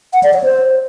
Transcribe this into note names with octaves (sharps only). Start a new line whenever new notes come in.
F#5
D5
C#5
C5